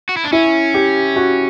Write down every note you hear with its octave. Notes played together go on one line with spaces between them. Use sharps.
F#4
E4
D4
C#4 E4
G4
F#4